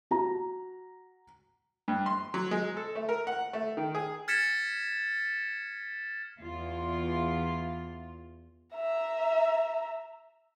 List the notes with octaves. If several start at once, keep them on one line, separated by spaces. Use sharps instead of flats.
F#4 A#5
G2
C6
F#3
G#3
A4
A3
A#4
F#5
A3
D#3
G#4
F6 G#6 A6 B6 C#7 E7
E2 F4
E5 A#5